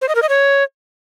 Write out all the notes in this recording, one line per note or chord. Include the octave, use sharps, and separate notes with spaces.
C5
D#5
A#4
D#5
C#5